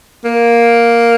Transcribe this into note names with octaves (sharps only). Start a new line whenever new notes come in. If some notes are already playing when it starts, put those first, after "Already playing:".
A#3